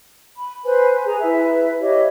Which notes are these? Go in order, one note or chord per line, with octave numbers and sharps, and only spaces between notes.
B5
B4 C5 G#5
G#4 G#5 A#5
E4 B4 E5
G4 C#5 D#5 E5